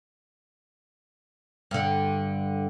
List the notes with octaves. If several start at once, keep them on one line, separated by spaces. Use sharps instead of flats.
G2 D3